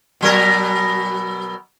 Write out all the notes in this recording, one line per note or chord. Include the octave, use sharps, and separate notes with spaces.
B2 F#3 A#4